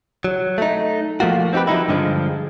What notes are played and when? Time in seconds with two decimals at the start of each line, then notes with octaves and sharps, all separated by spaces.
0.24 F#3
0.58 A3 D#4
1.20 F3 A3 A#3 F4 F#4
1.53 C4 D#4 F#4 G4 B4
1.67 F3 F#3 D#4 E4
1.89 G2 D3 F3 G#3